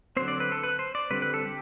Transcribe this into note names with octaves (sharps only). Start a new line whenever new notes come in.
D3 F#3 C4 C5
D5
B4
A4
B4
C5
D5
D3 G3 C4 B4
B4
A4
G4